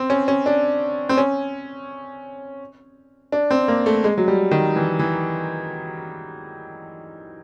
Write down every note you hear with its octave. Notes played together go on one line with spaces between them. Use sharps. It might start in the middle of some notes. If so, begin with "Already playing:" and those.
Already playing: C4
C#4
C#4
D4
C4
C#4
D4
C4
A#3
A3
G#3
F#3
G3
D#3
E3
E3